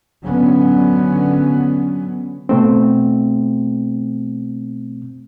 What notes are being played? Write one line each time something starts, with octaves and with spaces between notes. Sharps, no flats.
D3 F#3 B3 C#4
B2 A3 C4